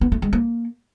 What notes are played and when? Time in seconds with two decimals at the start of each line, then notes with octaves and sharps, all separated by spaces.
0.01 B3
0.12 A3
0.22 G#3
0.33 A#3